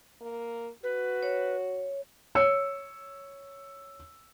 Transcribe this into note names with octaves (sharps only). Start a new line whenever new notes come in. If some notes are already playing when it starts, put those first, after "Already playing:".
A#3
F#4 B4
C#5
C#5 E6 C#7